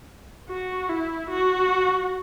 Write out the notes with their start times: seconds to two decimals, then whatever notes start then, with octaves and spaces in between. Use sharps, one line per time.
0.49 F#4
0.89 E4
1.30 F#4